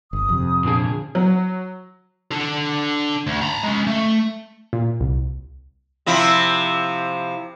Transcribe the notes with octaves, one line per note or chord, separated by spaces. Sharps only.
G1 D#6
F2 C3
A#2 D3 G#4
F#3
D4 A4
D2
A#5 B5
G#3 C#4
A3
A#2
C2
C3 F3 E4